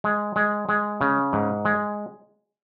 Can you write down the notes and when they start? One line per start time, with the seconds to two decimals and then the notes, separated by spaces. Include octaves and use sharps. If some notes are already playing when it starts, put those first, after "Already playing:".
0.04 G#3
0.36 G#3
0.69 G#3
1.01 C#3
1.33 G#2
1.65 G#3